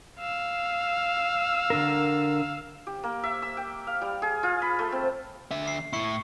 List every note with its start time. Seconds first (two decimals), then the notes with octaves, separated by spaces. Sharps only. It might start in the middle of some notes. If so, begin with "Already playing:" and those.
0.19 F5 E6
1.70 D3 D4 A#4
2.87 G4
3.03 A#3
3.23 E5
3.42 E6
3.57 G5
3.87 F5
4.01 G3
4.22 G#4
4.43 F4
4.62 B5
4.79 A3
4.92 C4
5.51 D3 E5
5.68 C7
5.93 A2 E4 C#6 C#7